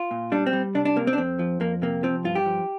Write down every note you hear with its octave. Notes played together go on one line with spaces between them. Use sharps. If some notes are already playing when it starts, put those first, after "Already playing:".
Already playing: F4
A#2
G3 D4
C4
G3
C2 D4
D4
C3 A#3
C4
D4
F2 C4
F3
F2 A#3
C3 A#3
F3 C4
G2 F4
G4
F3